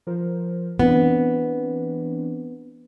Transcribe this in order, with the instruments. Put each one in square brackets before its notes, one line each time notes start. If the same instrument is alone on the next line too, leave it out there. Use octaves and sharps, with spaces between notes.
[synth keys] F3 A#4 C5
[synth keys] E3 C4 D4 [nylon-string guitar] B3